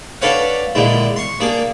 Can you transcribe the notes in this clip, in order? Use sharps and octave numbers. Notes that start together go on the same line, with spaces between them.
D4 A4 B4 C#5 F5 F#5
A#2 D3 G#3 E4
C6 C#6
A#3 D4 G#4